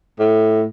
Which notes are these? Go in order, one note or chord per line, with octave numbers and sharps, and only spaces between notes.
A2